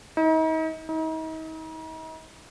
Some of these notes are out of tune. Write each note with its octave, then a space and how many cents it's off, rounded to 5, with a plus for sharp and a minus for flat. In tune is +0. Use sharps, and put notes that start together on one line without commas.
D#4 +40
D#4 +40